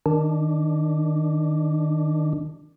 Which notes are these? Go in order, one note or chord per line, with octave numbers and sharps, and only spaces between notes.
D#3 D4